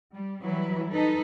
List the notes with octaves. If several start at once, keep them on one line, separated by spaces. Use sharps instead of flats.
G3
E3 F#3 G3 E4 B4
D#4 A4 B4